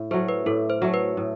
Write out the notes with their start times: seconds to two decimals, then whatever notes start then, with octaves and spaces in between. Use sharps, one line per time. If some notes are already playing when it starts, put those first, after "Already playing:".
Already playing: A2
0.11 F#3 A3 C5
0.29 B4
0.46 A2 A4
0.70 C5
0.82 F#3 A3
0.94 B4
1.17 A2